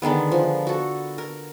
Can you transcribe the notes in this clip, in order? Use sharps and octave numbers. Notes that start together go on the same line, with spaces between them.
D3 D#3 G#3 B3
F3
F#4 A4
A#4